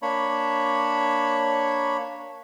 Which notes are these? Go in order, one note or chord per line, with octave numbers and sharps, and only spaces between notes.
A#3 D4 C#5 B5